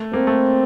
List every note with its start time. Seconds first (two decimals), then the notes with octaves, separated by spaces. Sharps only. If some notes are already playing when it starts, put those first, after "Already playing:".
Already playing: A3
0.13 A#3 C4
0.27 A3